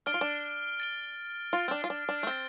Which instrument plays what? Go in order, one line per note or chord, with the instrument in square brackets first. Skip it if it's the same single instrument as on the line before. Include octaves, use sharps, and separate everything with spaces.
[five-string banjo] D4 [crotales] F6 D7 G7
[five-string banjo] F4
D4
[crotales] A6 D7 G7
[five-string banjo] F4 [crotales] F6 A6 D7
[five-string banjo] C4
D4
F4
D4
D4
A3
[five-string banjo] C4 [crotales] A6 D7 G7